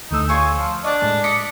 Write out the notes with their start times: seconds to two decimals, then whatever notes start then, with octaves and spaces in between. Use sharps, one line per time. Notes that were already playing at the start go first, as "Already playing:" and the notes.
0.11 D2 A3 D#4 E6
0.29 F4 C#5 G#5 C#6
0.55 F3
0.84 D4 C#5 D#5 A5
1.02 A2 G#3
1.24 D#5 D6 B6 C#7